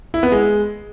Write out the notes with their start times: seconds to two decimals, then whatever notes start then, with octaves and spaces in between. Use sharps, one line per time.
0.14 E4
0.23 B3
0.32 G#3